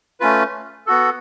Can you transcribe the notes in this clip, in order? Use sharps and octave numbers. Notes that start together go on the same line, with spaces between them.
A3 C#4 F4 B4
B3 F#4 A4